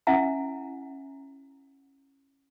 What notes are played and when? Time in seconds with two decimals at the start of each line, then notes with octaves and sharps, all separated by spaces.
0.07 C#4 E4 E5 F#5 G#5 A#5